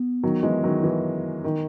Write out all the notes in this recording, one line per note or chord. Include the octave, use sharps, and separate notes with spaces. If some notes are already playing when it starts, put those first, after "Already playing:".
Already playing: B3
D#3 F#3
E3 G#3
D#3 F#3
E3
D#3